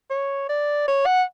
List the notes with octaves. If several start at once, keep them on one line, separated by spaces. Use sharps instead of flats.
C#5
D5
C#5
F#5